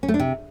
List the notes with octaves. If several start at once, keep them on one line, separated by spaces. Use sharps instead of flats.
C#4
A3
D4
C3